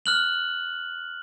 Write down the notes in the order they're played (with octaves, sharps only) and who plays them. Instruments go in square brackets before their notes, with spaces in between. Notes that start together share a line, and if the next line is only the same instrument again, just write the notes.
[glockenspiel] F6 F#6 F#7